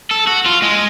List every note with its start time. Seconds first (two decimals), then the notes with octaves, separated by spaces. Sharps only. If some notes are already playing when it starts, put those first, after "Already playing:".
0.11 A4
0.27 F#4
0.46 F4
0.62 G#3